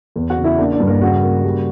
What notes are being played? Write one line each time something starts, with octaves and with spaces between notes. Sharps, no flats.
E2
F#4 F#5
C#3
E4 E5
A#3 D4 D5
D4 D5
G2
A#3 A#4
C#3 F#4
A#3
G3